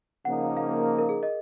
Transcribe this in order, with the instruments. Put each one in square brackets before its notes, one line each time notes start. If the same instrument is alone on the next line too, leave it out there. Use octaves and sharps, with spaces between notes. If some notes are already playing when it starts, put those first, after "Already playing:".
[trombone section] C#3 F3 A#3 D#4 [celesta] F#5
[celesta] F5
A#4
G#4
D#5